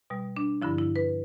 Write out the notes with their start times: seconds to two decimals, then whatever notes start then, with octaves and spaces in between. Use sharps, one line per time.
0.10 B2 G3
0.37 D4
0.62 G2 D3 F3 E4
0.78 E4
0.96 B4